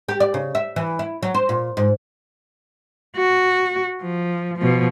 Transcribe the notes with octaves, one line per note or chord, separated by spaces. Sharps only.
G4
D5
C#3
E5
E3
E4
F#3
C5
A#2
G#2
F#4
F3
B2 F3